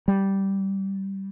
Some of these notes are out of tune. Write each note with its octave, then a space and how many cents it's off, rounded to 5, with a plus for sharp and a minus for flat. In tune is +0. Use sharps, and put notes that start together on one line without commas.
G3 -10